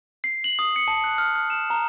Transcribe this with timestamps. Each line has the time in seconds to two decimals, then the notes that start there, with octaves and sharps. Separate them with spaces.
0.24 C7
0.44 F#7
0.59 D#6
0.76 C#7
0.88 A5
1.04 F#6
1.18 F6
1.36 F6
1.50 E7
1.70 A#5